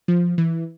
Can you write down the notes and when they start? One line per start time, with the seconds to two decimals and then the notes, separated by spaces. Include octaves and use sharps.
0.08 F3
0.38 E3